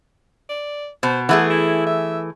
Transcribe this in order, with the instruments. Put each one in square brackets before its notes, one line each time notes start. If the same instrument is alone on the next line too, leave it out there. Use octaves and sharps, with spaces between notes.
[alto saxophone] D5
[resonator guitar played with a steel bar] B2 [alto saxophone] C5
[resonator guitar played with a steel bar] E3 A3 G#4 [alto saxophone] F#5
[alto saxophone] E4
E5